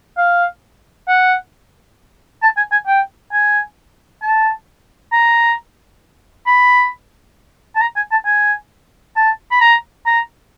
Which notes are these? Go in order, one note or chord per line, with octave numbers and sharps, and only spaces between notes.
F5
F#5
A5
G#5
G#5
G5
G#5
A5
A#5
B5
A5
A#5
G#5
A5
G#5
A5
B5
A#5
A#5